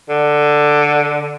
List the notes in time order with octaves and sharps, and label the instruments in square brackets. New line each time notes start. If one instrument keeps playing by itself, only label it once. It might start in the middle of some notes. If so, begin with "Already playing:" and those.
[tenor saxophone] D3